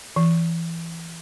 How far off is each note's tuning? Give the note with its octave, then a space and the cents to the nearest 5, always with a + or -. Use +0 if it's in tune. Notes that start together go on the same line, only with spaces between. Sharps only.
E3 +20